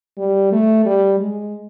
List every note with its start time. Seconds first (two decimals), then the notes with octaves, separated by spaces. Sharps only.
0.17 G3
0.52 A3
0.85 G3
1.19 G#3